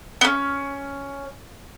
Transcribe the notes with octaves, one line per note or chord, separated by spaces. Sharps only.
B3 C#4